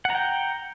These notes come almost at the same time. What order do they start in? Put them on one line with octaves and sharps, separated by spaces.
F#5 A#5 G5